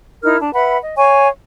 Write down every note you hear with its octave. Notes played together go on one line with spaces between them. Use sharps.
D#4 E4 A#4 F6
D4 A5
B4 E5 F#5 B5
D#5
C#5 F5 G#5 C#6